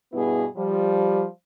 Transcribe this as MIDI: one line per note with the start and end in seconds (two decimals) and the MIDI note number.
0.13 0.45 43
0.13 0.45 47
0.13 0.45 59
0.13 0.45 64
0.13 0.45 68
0.56 1.25 53
0.56 1.25 55